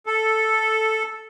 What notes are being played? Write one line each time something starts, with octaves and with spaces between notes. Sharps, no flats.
A4